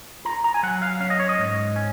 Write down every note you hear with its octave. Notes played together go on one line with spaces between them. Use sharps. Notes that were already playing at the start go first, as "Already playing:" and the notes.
F4 A#5
A#5
G#5
F#3 F#5
F5
C#4 F5
D#5
C#5
D#5
G#2
C#4